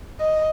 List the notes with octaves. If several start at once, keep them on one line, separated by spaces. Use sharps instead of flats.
D#5